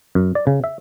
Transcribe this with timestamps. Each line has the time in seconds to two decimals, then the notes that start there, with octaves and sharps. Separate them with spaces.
0.15 F#2
0.35 D5
0.47 C#3
0.64 E5